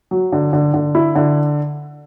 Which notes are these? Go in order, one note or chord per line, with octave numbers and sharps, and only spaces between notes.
F#3
D3
D3
D3
E4
D3